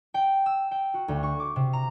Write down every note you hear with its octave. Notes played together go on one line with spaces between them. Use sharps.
G5
E6
G5
F#4
D2
C#6
D6
C3
A#5